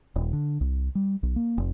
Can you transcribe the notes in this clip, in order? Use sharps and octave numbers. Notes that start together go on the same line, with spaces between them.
D#1
D3
C2
G3
B1
A#3
F1